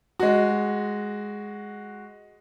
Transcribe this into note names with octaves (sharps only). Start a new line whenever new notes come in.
G#3 F#4